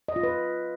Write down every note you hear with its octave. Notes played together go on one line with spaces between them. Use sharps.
D#5
F4
B4